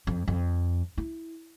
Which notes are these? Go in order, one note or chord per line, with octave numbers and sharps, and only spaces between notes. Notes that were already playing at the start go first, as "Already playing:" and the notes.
F2
F2
E4